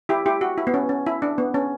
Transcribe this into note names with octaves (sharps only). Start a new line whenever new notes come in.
E4 G4
E4 G4
F#4
E4
B3
C#4
C#4
E4
D4
B3
C#4